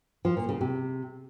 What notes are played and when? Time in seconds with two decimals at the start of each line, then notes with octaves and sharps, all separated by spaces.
0.25 F3
0.37 A#2
0.49 C#3
0.61 C3